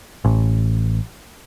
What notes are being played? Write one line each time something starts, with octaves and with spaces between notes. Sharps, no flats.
A1